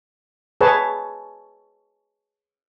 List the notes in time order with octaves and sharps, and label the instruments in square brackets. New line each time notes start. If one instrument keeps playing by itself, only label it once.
[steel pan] G#4 B4 C#5 A5